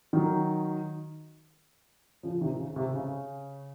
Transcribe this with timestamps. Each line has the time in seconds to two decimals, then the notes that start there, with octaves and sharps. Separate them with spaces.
0.13 D#3 F#3
2.23 C#3 F3
2.41 C3 D#3
2.59 C#3
2.76 C3
2.95 C#3